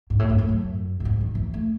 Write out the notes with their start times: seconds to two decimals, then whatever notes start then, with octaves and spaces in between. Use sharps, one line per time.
0.10 G#2
0.19 A2
0.30 G#2
0.38 A2
0.49 F#2
1.00 A2
1.05 G#2
1.21 D#3
1.35 E3
1.54 A3